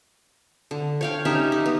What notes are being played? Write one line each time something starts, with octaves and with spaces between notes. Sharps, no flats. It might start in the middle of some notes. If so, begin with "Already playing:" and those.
D3
C#5 F5 G5
C#4 D#4 G4 E5
D#4
B3